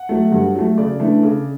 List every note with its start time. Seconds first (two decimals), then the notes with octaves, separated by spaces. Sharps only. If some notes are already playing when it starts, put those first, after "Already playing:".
Already playing: F#5
0.09 F#3 A3
0.32 G2
0.55 F#3 A3
0.78 C#3 D5
1.00 E3 A3 D4
1.23 C#3